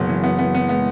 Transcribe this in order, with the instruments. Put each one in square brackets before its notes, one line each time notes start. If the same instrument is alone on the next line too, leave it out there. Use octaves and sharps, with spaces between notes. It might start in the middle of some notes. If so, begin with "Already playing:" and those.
Already playing: [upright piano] F#1 B3 [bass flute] F#3
[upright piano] E3
B3
B3
B3
[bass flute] G#3 [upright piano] B3